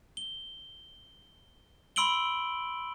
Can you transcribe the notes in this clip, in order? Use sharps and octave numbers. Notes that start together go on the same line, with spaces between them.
G7
B5 C6 E6 D7 F#7 G7